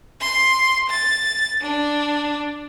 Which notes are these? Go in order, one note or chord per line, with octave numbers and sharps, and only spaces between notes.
C6
A6
D4